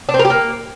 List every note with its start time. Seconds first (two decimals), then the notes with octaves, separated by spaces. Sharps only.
0.09 D4
0.14 C4
0.19 A#4
0.25 G4
0.30 A#3